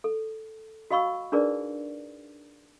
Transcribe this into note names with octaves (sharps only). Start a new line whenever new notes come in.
A4
F#4 D#5 F5 B5 C#6 E6
D4 D#4 G#4 A#4 B4 D5